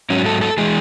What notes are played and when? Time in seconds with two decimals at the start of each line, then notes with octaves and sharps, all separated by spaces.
0.10 G#2 F#3 C#4
0.26 A4
0.41 A4
0.58 E3 G#3 G#4